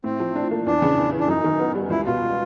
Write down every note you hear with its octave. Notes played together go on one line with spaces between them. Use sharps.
A2 C4
F3
D4
A#3
E2 D4
C#3
E2
E3
D4
F#2 D#4
D#3
B3
G3
C#2 E4
B2 F4